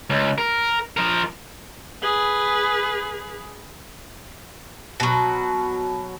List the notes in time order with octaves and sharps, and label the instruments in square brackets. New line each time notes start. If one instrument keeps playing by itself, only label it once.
[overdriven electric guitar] C#2
A#4
F3 A#4
[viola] G#4 B4
[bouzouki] B2 F#3